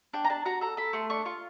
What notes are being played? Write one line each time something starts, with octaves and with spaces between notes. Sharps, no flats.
D4 G5
A#5
D4 A5
F#4 A#5
A4 A#5
A4 B5
A3 C6
D4 C#6
F4 C#6